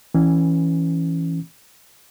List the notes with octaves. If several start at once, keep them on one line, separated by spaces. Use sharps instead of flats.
E3 C#4